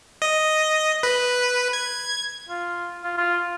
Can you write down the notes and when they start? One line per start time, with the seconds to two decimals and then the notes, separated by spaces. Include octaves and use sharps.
0.22 D#5
1.03 B4
1.73 G#6
2.49 F4
3.03 F4
3.17 F4